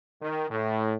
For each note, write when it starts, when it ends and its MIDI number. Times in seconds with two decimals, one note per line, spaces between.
0.22 0.50 51
0.51 0.95 45